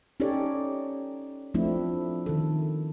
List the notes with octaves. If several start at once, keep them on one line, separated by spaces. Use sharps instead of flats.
C#4 D#4 G4 A4 C#5 D5
F3 A3 C4 D4 E4
D#3 A4